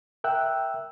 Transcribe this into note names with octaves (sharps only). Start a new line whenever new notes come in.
A#4 E5 G5 E6 F#6